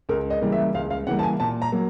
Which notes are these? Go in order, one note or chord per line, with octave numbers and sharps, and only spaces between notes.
C#2 A#4
D#5
C#3 E3 G3 A#3
E5
C#2 F5
F5
C#3 E3 G3 A#3 F#5
A5
G#5
A#2 A5
A#5
F#3 A#3